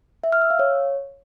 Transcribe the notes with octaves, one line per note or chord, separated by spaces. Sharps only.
E5
F6
E6
F5
C#5